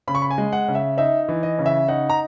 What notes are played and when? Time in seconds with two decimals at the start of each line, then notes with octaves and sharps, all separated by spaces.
0.08 C#3 B5
0.15 C#6
0.22 B5
0.30 G#5
0.38 G#3
0.53 F#5
0.68 C#3
0.75 E5
0.97 D#4 E5
1.29 E3
1.43 D#5
1.59 C#3
1.66 E5
1.88 D#4 F#5
2.10 A#5